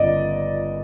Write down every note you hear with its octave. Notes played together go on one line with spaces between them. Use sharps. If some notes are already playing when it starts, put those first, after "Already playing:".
Already playing: G1 D5 D#5